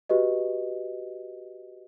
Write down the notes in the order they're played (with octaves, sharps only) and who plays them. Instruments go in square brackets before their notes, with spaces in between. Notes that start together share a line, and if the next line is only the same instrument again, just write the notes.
[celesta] F#4 G4 B4 D#5